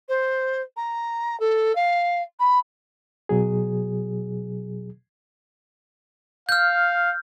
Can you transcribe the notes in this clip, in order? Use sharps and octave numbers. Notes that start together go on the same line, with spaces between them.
C5
A#5
A4
F5
B5
B2 F#3 G#4
F5 F6 G6